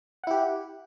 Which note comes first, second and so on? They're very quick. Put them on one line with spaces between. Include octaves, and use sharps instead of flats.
F#5 E4 G4